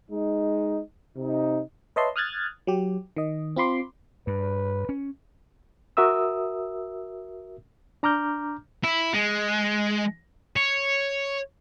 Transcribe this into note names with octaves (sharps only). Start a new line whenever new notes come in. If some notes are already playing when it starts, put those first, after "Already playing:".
G#3 D#4
C3 D#4
B4 C#5 D#5 E5 A5 C6
D#6 F6 F#6 G#6 A6
F#3 G4
D#3 D#5
C4 F4 B5 C6 D6
G2 B4
C#4
F#4 A#4 E5 D#6 E6
D4 A#5 D6 F6 G6
E4
G#3
C#5